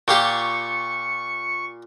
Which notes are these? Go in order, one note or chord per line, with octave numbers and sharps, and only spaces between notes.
A#2 F4 G4 C#6